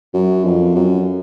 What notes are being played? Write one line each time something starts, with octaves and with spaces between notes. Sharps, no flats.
F#2
F2
F#2